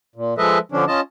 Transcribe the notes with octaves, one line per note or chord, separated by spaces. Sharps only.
A#2
F3 G#3 A4 B4 D#5 E5
D3 F3 C#4 D4
C#4 F4 D#5 A5